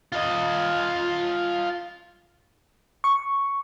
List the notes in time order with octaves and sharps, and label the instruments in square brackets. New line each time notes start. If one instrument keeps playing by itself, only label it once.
[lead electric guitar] F4 D#5
[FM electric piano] C#6